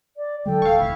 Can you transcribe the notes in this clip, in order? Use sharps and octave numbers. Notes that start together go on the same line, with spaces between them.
D5
D3 F#3 G#3 A4 G5
D#1 F5 C#6
F1 D2 E4